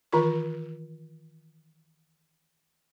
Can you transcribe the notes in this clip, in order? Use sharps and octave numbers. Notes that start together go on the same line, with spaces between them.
D#3 E3 F4 A#4 C#6